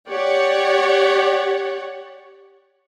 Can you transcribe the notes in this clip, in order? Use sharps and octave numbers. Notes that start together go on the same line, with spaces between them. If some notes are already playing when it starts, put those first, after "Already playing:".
G4 C#5 D5 F#5